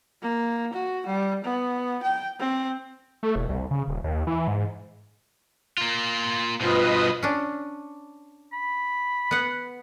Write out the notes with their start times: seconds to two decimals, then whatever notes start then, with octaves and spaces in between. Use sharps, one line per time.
0.22 A#3
0.73 F#4
1.07 G3
1.44 B3
2.03 G5
2.40 C4
3.23 A3
3.36 E1
3.49 C2
3.71 C#3
3.88 D#1
4.04 D#2
4.27 E3
4.48 G#2
5.78 A#3 F4
6.60 G2 B2 F4 B4 C5 D#5 D#6
7.23 C#4 D4
8.53 B5
9.31 B3 F#5